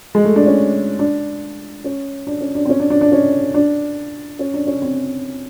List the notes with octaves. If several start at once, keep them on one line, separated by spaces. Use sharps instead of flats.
G#3
A3
D4
C#4
D4
C#4
D4
C#4
D4
C4
C#4
D4
D4
D4
C#4
D4
C#4
D4
C#4
C4